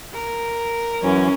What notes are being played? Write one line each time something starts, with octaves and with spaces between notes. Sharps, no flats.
A#4
F#2 E3 F#3 C#4